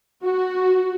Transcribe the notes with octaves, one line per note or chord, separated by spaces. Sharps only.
F#4